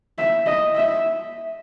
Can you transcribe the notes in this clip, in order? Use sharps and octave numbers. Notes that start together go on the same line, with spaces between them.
E5
D#5
E5